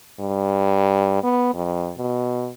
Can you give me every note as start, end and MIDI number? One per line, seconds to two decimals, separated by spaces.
0.20 1.19 43
1.23 1.51 59
1.54 1.92 41
1.97 2.50 47